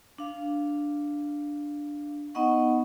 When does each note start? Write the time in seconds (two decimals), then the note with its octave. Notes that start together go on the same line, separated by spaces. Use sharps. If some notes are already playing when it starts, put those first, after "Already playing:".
0.18 D4 F5
2.35 B3 D#4 D#5 F#5 C#6